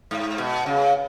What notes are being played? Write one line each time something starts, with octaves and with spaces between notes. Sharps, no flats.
G#2
B2
C#3